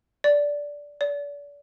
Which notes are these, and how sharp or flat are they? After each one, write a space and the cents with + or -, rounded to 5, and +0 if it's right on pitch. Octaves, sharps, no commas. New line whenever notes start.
D5 -10
D5 -35